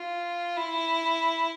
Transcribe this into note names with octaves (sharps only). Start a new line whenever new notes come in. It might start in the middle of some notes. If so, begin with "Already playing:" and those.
Already playing: F4
E4